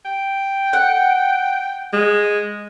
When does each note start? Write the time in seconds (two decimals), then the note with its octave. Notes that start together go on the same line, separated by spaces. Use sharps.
0.05 G5
0.73 F#5
1.93 G#3